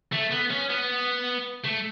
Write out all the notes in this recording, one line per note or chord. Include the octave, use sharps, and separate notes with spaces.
A3
B3
C#4
B3
A3